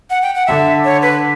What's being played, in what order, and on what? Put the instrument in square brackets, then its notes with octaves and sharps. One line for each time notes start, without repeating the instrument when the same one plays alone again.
[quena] F#5
G5
F#5
[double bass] D3 [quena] E5
[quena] C#5
B4